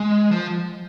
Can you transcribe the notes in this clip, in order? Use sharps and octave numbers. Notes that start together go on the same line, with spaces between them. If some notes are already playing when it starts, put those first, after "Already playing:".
Already playing: G#3
F3